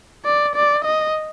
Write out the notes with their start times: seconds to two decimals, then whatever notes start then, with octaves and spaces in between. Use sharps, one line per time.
0.25 D5
0.55 D5
0.85 D#5